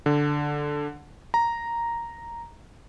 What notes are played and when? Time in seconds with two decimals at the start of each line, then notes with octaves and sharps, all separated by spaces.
0.06 D3
1.34 A#5